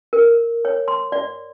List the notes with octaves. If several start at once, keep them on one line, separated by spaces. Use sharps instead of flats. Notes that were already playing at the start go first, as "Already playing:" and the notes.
A#4
C#5
C6
D5